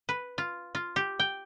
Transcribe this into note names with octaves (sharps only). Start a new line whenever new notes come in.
B4
F4
F4
G4
G5